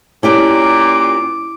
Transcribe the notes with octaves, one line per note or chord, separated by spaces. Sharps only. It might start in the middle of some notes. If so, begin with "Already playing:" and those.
A#2 C#4 E4 G4 D5 D6